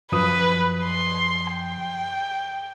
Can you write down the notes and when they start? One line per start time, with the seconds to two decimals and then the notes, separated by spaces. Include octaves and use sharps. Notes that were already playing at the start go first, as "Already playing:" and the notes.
0.12 F#2 F3 B4 D#6
0.84 C6
1.53 G5